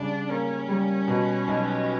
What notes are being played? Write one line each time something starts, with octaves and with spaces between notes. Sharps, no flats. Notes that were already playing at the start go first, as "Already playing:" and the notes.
Already playing: C#3 G3 D4
A#3 C#4
G3
B2
B1